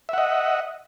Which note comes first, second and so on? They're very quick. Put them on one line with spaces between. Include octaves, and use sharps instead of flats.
E5 F#5 D#5